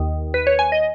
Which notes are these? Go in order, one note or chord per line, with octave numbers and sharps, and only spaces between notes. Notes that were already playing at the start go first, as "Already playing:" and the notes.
Already playing: D#2 D#3
B4
C#5
G#5
D#5